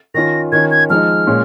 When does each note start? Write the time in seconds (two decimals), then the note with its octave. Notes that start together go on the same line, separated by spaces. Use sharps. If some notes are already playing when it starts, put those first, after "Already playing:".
0.14 D#3 C#4 F4 A#6
0.52 D#3 C#4 F4 G#6
0.71 G#6
0.90 F3 G#3 D#4 F6
1.27 A#2 G#3 C#4 F4